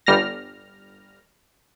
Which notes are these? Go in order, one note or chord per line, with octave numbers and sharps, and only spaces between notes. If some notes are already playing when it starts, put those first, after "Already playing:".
G1 G3 F6 A#6